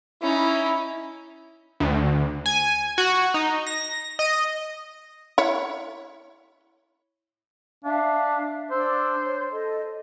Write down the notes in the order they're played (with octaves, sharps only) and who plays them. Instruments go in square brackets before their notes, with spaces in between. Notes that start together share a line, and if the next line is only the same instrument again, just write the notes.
[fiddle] C#4 D#4 [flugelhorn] E4
[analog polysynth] D2
G#5
F#4
D#4
A#6
D#5
[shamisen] E4 C#5
[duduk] D4 [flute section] E5 F5
[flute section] D4 E6 [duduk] C5
[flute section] C#5
A4 D#5